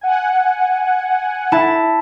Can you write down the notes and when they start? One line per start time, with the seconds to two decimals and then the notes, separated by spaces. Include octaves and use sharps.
0.01 F#5 G#5
1.52 E4 A5